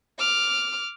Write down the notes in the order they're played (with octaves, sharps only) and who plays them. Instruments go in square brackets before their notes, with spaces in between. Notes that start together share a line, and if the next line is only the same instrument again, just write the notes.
[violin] D6 F6